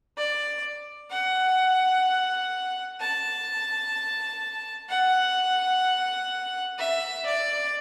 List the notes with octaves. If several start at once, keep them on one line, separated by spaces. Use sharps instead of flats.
D5
F#5
A5
F#5
E5
D5